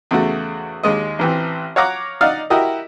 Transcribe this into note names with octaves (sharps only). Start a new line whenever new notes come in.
E2 C#3 A3 F#4
D#2 G#3 D#5
A1 E3 C4
C#5 F5 F#5 A#5 D6
D#4 D5 F5 F#5
E4 F#4 G4 A#4 D#5